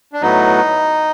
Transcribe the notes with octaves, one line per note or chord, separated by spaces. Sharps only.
D4
A2 F#3 B3 D#4